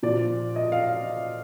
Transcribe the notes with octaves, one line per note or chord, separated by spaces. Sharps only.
A#2 F3 D5
D#5
F5